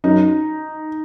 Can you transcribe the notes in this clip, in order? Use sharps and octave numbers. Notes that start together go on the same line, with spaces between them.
F#2 D#4